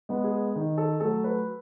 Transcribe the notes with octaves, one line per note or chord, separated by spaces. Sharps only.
G#3 B3
G#4
D#3
A4
F#3 A3 A4
B4